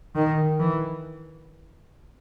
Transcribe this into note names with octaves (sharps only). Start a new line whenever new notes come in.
D#3
E3